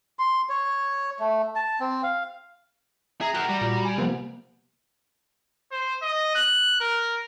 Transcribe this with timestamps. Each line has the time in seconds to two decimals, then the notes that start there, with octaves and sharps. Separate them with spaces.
0.19 C6
0.49 C#5
1.20 A3
1.56 A5
1.80 C4
2.03 F5
3.21 G#4 E5 A#5
3.34 F#4 G4 A#4 F#6 C7
3.49 G3
3.61 A#2
3.85 G#5
3.98 C3 F3 A#3 B3
5.71 C5
6.02 D#5
6.35 F#6
6.80 A#4